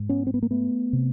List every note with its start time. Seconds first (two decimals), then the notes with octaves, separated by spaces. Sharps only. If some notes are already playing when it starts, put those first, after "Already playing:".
Already playing: G#2
0.09 B3 C#4
0.27 C4
0.34 B3
0.42 A#3
0.51 A3 B3
0.93 C3